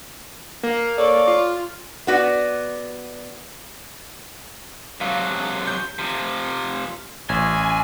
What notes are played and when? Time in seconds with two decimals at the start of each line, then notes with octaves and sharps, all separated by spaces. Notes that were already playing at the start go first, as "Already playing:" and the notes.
0.63 A#3
0.97 A4 C#5 D5
1.28 F4
2.07 B3 F#4 D5
5.01 C3 F#3 F5
5.67 G6
5.99 C3 F3
7.29 A1 G#5